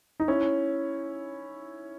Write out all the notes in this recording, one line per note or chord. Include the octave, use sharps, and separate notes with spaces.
D#4
C#4 E4